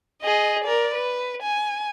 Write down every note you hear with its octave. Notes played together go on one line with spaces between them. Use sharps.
G#4 D#5
A#4 D5
B4
G#5